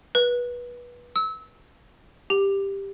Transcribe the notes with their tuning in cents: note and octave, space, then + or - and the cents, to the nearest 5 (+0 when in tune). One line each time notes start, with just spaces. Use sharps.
B4 -25
E6 -25
G4 +5